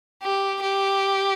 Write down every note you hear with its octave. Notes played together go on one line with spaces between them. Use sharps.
G4
G4